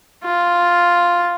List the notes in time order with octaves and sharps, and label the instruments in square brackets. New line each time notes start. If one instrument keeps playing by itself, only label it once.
[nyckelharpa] F4